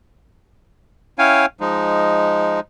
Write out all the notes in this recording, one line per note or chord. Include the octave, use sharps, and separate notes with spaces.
C#4 E4 C#5 F5 G5 G#5
F3 G#3 D#4